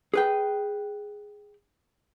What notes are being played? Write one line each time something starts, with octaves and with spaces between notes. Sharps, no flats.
G#4 B4 G5